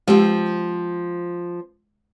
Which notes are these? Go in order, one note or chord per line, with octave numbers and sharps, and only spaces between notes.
F3 G#3 C4 G4